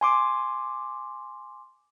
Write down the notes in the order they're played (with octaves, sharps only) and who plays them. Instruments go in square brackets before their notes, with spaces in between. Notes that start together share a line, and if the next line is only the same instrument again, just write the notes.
[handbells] G#5 C6 D6